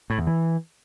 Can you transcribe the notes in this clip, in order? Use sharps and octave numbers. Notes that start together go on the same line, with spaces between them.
A2
E2
E3